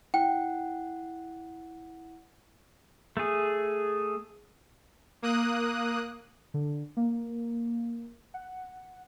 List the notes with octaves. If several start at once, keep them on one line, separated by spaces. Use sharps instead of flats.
E4 F#5 G5
A3 G#4
A#3 D#6 F#6
D3
A#3
F#5